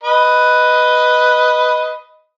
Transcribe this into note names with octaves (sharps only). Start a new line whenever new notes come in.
B4 D#5